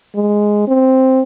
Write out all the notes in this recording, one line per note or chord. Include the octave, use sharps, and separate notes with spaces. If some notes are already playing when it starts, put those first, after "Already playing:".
G#3
C4